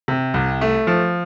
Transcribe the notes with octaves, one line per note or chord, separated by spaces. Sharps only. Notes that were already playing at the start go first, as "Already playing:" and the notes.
C3
C2
A3
F3